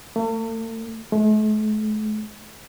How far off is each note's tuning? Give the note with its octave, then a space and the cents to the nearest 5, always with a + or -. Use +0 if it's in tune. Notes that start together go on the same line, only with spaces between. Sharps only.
A3 +45
A3 -45